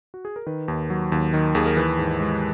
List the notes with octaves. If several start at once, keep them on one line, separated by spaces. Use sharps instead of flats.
F#4
G#4
A#4
D#3 B4
D#2
F#3
D#2
D#3
D#2 G#4
A#4
E3 B4
G#2
G#3